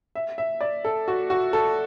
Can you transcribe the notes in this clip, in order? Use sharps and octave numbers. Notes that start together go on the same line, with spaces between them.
E5
E5
D5
A4
F#4
F#4
A4